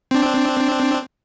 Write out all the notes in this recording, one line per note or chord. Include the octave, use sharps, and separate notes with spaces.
C4 D4